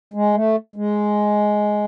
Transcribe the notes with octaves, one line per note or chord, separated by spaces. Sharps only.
G#3
A3
G#3